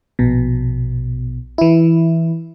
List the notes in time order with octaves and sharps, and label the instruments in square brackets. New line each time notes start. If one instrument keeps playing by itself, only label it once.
[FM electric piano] A#1 B2
E3 E4